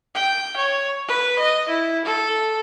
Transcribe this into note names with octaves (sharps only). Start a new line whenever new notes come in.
G5
C#5
B4
D#5
E4
A4